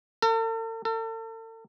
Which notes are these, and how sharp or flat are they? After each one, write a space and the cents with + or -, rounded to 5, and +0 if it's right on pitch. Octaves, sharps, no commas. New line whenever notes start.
A4 +45
A4 +40